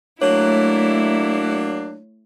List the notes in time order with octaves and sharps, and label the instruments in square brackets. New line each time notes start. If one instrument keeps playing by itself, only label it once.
[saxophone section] F#3 A#3 D4 [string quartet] A3 E4 [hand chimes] C#5